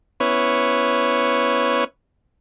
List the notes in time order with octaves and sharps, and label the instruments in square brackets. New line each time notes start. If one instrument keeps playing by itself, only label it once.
[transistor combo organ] B3 C#4 E4 B4 C#5